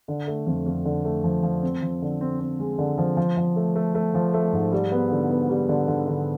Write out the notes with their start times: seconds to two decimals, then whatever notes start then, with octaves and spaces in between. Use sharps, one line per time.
0.08 D3
0.27 A3
0.47 F2
0.66 F2
0.85 D3
1.05 A3
1.24 F3
1.43 F3
1.62 C4
1.82 F3
2.02 D3
2.21 C4
2.40 C4
2.60 G#3
2.78 D3
2.98 F3
3.17 F3
3.37 F3
3.56 A3
3.75 A3
3.95 A3
4.14 F3
4.34 A3
4.53 G#2
4.72 G3
4.92 B3
5.11 D3
5.30 B3
5.49 G3
5.69 D3
5.88 D3
6.08 D3